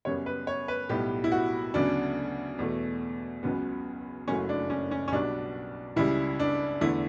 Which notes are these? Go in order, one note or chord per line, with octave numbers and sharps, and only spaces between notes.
F#2 C#3 G3 B3 C#5
B4
C#5
B4
B1 A2 G3 B3 G4
E4
F#4
D2 C#3 F#3 B3 D4
E2 B2 A3
C#2 C#3 F#3 B3
F#1 F#2 C#3 F#3 A3 C#4
D4
C#4
C#4
C#4
B1 B2 G3 B3 D4
C#2 C#3 G3 E4
D4
E2 D3 A3 E4